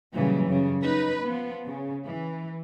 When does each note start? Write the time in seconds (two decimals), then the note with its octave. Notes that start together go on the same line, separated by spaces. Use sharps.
0.15 A#2 C#3 E3 F#3 G3
0.48 F#2 C#3 G3
0.81 D#4 B4
1.25 F3 B3
1.66 C#3
2.08 E3